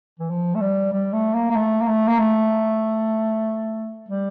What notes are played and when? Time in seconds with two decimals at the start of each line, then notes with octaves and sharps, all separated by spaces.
0.19 E3
0.30 F3
0.55 A3
0.61 G3
0.92 G3
1.13 A3
1.34 A#3
1.50 A#3
1.55 A3
1.81 A#3
1.87 A3
2.08 A#3
2.19 A3
4.09 G3